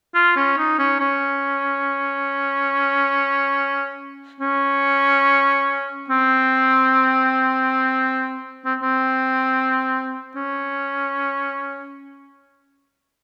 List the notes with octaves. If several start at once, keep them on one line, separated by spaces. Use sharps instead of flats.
F4
C#4
D#4
C#4
C#4
C#4
C4
C4
C4
C#4